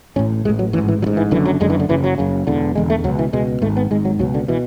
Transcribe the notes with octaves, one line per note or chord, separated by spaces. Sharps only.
A1 A2 C#4
A1 A2 G#3
F#3
A1 G#2 E3
E3
A1 G#2 F#3
E3
F#1 F#2 D3 E3
F#3
F#1 F#2 D3 G#3
E3
D3
F#1 F#2 C#3 E3
F#3
F#1 F#2 C#3
E1 E2 D3
E1 E2 D3 G#3
A3
C#2 B2 F#3
E3
C#2 B2 G#3
G#1 G#2 A3
B3
G#1 G#2 G#3
F#3
C#2 B2 F#3
D3
B2 E3